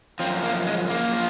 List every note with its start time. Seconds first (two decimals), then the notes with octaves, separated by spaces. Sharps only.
0.20 F3 C4
0.24 F#2
0.44 A#3
0.66 G#3
0.90 A#3
1.13 F3